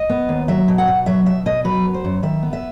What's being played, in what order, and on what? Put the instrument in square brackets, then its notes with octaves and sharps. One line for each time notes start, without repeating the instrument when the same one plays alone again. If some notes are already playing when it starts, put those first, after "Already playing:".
Already playing: [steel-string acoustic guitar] D#5
B3
D#2
F#3 E5
B2
F#5
B2
F#3 E5
B2 E5
B2 D#5
F#3 B4
F#2
C5
F#2
D#3 E5
B3
E5